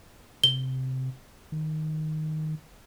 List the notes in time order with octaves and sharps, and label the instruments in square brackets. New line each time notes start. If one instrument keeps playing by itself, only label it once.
[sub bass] C3 [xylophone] G7
[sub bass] D#3